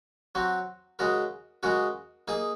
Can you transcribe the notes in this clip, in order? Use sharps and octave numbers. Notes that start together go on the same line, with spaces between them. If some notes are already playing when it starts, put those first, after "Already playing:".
F#3 C4 F#4
C#3 G#3 C#4 F#4 A#4
C#3 G#3 C#4 F#4 A#4
A#3 D#4 G#4